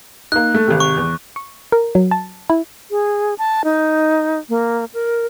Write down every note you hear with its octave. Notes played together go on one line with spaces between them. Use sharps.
A#3 D#4 F#6
A3 A4
G#1 C3
C#6
E2
C#6
A#4
F#3
A5
E4
G#4
A5
D#4
A#3
A#4